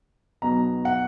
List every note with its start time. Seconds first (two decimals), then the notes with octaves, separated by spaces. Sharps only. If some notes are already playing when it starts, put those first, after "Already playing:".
0.42 B1 B2 F#3 A#5
0.85 F#5